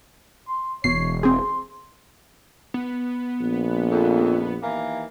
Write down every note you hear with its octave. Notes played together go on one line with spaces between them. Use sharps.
C6
E1 B2 C#5 C7
C4 G#4 C6
B3
A#1
F2
D#2 E3 A#3